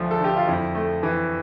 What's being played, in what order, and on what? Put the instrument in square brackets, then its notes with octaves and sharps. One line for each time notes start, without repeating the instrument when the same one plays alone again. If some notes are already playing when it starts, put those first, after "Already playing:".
Already playing: [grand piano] D2 F3 A3
A4
D3 G4
F4
F2 E4
A3
E3